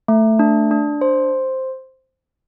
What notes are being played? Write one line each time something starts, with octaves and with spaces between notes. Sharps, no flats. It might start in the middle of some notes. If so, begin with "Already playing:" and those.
A3
D4
D4
C5